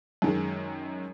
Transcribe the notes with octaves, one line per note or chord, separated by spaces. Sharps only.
F#2 D#3 G#3